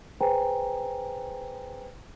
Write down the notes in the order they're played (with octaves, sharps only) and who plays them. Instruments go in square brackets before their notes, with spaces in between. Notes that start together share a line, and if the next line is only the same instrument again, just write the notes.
[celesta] G#4 B4 C5 G5 G#5 A#5